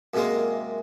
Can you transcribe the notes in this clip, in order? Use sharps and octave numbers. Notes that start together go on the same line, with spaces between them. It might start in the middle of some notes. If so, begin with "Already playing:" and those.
F#2 C3 G#3 A#3